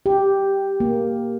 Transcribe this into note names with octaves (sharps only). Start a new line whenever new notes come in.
G4
A#3